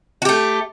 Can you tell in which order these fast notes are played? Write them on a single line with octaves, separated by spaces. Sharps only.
F#4 G4 A3